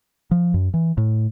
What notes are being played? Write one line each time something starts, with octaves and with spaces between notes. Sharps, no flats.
F3
F#2
E3
A2